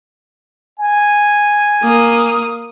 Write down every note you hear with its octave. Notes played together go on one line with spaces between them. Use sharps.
G#5
A#3 D#6